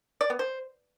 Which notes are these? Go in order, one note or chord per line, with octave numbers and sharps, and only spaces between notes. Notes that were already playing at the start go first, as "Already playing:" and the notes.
D5
B3
C5